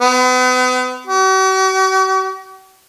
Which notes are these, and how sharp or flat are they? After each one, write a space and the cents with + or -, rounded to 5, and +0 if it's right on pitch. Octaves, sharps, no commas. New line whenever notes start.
B3 +40
F#4 +45